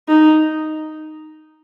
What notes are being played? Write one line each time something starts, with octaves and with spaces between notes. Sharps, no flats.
D#4